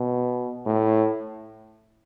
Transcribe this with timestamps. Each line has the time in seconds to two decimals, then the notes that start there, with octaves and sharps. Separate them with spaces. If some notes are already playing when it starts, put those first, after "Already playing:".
Already playing: B2
0.66 A2